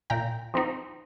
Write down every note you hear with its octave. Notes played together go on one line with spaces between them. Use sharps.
A#2 G5 A#5
F3 C4 D#4